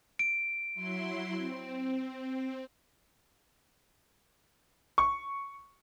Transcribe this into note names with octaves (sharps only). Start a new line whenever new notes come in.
D7
F#3 E4 C6
C4
C#6